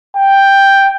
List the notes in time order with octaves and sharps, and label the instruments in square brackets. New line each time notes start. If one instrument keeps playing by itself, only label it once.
[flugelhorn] G5